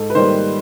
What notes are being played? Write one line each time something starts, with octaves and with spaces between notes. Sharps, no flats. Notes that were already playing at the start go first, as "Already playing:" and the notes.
Already playing: G#2 A4
B4
D#3 G3 A#3 C5